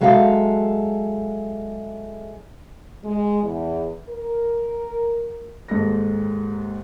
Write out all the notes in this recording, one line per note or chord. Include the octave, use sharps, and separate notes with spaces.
F#3 G#3 A4 E5 F5
G#3
E2
A#4
D#2 G#2 A4 A#6